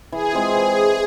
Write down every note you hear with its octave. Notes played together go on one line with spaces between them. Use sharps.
E3 G#4
G#3 C4 F4
E3